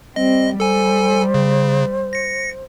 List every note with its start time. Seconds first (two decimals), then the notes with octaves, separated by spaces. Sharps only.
0.16 G3 C4 D#5
0.60 G3 A4 C5 G#5
1.34 C#3
2.13 A#6 C#7